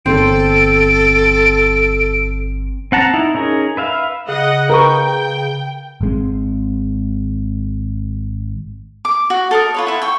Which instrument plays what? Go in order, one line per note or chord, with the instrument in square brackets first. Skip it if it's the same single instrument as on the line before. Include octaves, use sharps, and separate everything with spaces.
[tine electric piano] G1 [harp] C4 [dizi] A4 [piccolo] D7
[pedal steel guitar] C4 F#5 A5 A#5
D#4 E4
C#4 D#4 G#4 A#4
B4 E5 F5
[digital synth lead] C#3 [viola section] D#5 F#5
[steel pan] A#4 B4 C#6 [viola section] G5
[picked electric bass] G#1 G#3 C4
[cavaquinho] D6
F#4
A4 A#4 D#5
F4 B4 C#5
E4 A4 F#5
G5 C#6